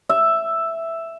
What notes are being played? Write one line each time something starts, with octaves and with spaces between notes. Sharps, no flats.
E5